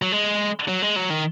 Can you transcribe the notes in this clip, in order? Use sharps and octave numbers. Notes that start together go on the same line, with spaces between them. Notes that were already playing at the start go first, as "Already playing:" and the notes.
F#3
G#3
F#3
G#3
F#3
D#3